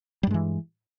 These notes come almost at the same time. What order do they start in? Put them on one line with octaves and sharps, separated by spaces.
G3 G2 G#3 E3